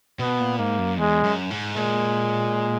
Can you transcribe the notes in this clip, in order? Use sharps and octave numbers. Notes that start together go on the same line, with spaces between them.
B2 B3
A#2
G#2 A#3
F#2
E2 G#3
F#2
G#2
A#2 G#3